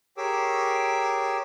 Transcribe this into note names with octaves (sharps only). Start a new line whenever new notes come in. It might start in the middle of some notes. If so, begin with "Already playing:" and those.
G4 G#4 A#4 C#5 D6 E6